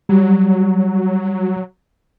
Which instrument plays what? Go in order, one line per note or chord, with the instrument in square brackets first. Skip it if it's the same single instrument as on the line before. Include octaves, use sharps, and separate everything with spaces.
[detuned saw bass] F#3 [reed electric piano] G3